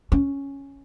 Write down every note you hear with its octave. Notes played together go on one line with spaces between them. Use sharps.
C#4